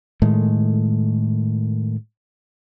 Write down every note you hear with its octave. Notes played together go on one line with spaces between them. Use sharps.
A2 D#3 G#3 A3